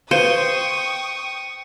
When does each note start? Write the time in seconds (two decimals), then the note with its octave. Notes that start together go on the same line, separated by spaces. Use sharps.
0.11 B4 C5 F5 G5 C#6 D#6 C#7 D#7